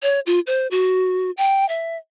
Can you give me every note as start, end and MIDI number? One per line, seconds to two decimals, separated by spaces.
0.03 0.20 73
0.26 0.40 65
0.47 0.67 72
0.71 1.31 66
1.37 1.67 79
1.69 1.97 76